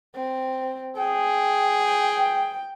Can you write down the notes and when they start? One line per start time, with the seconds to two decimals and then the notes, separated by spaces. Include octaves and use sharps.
0.15 C4
0.97 G#4 G5
1.84 G5